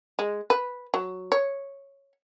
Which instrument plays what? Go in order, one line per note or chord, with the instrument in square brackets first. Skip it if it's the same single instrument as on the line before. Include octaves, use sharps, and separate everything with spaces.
[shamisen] G#3
B4
F#3
C#5